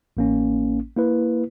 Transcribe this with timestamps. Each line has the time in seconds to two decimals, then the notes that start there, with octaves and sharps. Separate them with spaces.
0.17 A1 A#3 C#4
0.96 A#3 E4 B4